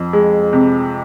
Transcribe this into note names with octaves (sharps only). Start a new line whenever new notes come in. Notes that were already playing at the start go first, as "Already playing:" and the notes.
Already playing: F2
G#3
C3